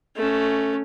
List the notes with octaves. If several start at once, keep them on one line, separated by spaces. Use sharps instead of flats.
A3 C#4